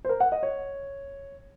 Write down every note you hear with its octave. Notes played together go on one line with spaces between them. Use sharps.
C5
A#4
F#5
D#5
C#5